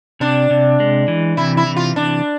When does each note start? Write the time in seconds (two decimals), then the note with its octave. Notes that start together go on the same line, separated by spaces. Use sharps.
0.20 C3 D4
0.50 C3
0.80 G#3
1.08 E3
1.37 C3 E4
1.57 E4
1.66 E3
1.76 F4
1.96 C3 D4